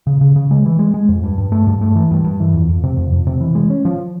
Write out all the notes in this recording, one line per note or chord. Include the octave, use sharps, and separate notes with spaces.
C#3
C#3
C#3
G#3
E3
G#3
G#3
F2
G2
G2
A3
G2
A3
E3
G2
G2
E3
F2
F2
C3
F2
F2
C3
E3
G#3
C#4
F3